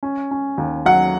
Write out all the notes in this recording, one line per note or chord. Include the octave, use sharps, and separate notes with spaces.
C#4
C#4
D#2
F#3 F#5